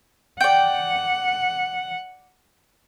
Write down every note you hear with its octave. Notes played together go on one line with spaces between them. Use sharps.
D5 F#5 G5